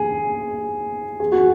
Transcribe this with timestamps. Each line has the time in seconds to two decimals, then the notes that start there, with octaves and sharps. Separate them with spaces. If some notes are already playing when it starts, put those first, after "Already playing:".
Already playing: G#4
1.20 G#4
1.32 F#4